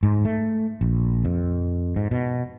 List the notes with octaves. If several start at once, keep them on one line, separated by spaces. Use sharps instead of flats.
G#2
A3
A#1
F2
G#2
B2